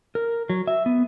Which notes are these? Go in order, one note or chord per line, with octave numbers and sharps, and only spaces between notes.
A#4
F#3
E5
B3